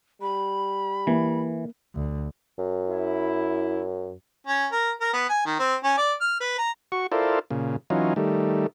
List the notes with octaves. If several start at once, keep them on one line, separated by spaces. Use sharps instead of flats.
G3 B5
E3 A#3
D2
F#2
E4
C#4
A#4
A#4
B3
G#5
D#3
C4
C#4
D5
F6
B4
A#5
F#4 C#6
E4 F4 A4 A#4 C5 D5
A#2 C#3
E3 F#3 C#4 D#4 F4
D#3 G3 A3